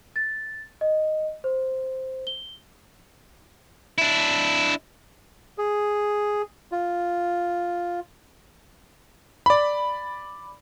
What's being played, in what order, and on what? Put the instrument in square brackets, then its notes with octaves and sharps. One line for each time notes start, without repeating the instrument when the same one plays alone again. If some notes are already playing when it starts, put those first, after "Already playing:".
[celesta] A6
D#5
C5
G7
[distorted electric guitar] D4 E4
[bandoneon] G#4
F4
[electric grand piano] D5 B5